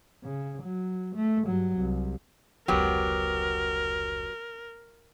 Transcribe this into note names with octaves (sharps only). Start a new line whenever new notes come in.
C#3
F#3
A3
G2 F#3
C2
F1 C#2 F#3 B3 G4 A#4